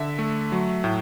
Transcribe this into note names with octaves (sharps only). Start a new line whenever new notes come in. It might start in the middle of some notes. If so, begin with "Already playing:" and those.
Already playing: D3 E5
A3
F#3
A2